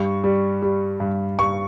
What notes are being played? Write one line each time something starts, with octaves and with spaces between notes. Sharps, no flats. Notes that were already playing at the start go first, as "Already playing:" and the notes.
Already playing: G2 C#6
G3
G3
G2
G2 C#6